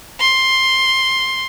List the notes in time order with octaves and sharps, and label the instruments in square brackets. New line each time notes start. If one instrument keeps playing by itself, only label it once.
[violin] C6